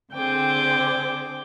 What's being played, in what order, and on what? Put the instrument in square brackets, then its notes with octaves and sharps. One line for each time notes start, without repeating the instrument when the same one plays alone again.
[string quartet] D3 C4 G#4 [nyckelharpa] G5 D6